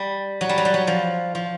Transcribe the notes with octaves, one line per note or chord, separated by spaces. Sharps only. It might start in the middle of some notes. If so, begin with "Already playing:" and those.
Already playing: G3
F#3
G3
F#3
G3
F#3
F3
F3